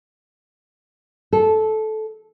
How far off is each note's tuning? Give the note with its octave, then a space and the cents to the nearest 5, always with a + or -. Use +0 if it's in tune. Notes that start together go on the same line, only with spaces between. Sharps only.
A4 -15